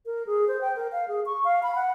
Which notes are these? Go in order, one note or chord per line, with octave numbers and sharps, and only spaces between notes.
A#4
G#4
C5
G5
A#4
F5
G#4
C#6
F5
B5
F#5